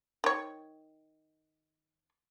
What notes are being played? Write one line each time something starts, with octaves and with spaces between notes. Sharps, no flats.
D#3 C#5